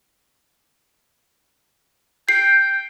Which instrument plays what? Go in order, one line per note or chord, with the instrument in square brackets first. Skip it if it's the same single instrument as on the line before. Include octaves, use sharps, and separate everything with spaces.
[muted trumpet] G5 [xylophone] C7